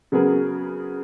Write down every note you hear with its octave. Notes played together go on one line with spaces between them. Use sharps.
C#3 F#3 B3 G#4 A#4